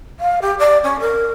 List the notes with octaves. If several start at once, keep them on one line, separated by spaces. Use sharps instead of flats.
F5
G4
D5
C#4
A#4